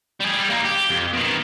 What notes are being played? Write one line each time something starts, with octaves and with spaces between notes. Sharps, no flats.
G3 G#4
G3
A#3 D#4
G4
F2
B2 D#3